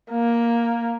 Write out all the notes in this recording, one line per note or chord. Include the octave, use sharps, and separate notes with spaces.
A#3